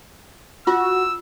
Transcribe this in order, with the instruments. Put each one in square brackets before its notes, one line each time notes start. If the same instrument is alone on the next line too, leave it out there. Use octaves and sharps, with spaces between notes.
[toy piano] F4 [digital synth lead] F#4 [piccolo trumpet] E6